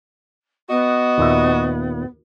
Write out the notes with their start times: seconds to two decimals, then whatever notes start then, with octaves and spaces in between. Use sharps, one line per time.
0.69 B3 F#4 D#5
1.18 D#2 A#2 E5